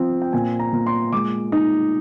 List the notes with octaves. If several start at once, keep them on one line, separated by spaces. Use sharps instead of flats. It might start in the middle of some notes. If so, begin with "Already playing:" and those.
Already playing: F3 C4
G5
A#2 G#5
A#5
A#2
C6
G#3 D6
D#4